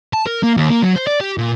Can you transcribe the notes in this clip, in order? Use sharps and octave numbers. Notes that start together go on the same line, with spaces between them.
A5
A#4
A#3
D#2
A#3
F#3
C5
D5
G4
A#2